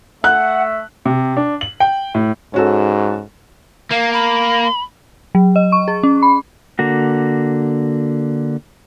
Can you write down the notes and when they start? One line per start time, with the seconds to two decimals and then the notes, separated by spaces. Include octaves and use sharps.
0.24 A3 E5 F#5 F#6
1.05 C3
1.37 D4
1.61 F#7
1.80 G5
2.15 A2
2.54 G#2 C#4 F#4 A4
3.91 A#3 F5
4.13 B5
5.35 F#3
5.56 D#5
5.72 C#6
5.88 G#4
6.03 C#4
6.22 B5
6.79 D3 A#3 F#4